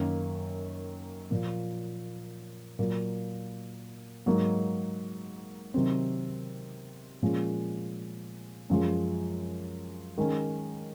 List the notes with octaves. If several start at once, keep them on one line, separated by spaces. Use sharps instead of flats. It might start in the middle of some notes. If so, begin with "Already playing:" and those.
Already playing: F#2 D#3 A#3
A#2 F3 A#3
A#2 F#3 A#3
G#2 F#3 A#3 D#4
C3 D#3 F#3 C4
A#2 F3 G#3 C#4
F#2 F3 G#3
D#3 G#3 C#4